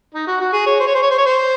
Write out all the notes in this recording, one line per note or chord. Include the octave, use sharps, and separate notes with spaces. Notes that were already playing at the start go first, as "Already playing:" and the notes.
D#4
F#4
F#4
G#4
C#5
C5
C#5
C5
C#5
C5
C#5
C5